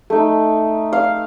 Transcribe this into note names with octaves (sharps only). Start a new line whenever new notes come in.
A3 D#4
F5